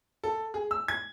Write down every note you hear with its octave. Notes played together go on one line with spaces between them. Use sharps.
A4
G#4
E6
G#6